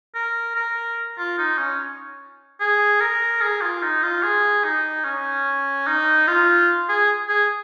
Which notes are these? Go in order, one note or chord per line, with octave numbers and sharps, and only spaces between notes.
A#4
A#4
F4
D#4
C#4
G#4
A#4
G#4
F4
D#4
F4
G#4
D#4
C#4
D#4
F4
G#4
G#4